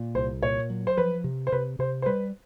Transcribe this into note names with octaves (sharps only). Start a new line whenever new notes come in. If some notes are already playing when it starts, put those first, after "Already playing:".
Already playing: A#2
C2 C5
A#2 C#5
F#3
C5
F3 B4
C3
C5
C3 B4
C3 C5
C5
G3 B4